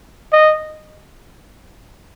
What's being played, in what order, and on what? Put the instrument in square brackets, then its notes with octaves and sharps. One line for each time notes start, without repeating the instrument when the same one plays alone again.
[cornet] D#5